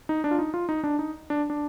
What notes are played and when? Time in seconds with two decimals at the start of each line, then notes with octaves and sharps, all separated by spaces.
0.09 D#4
0.24 D4
0.31 F4
0.39 D#4
0.54 F4
0.69 D#4
0.84 D4
0.99 D#4
1.30 D4
1.50 D4